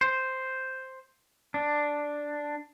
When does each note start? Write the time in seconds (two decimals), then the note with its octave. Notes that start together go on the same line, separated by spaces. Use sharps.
0.01 C5
1.54 D4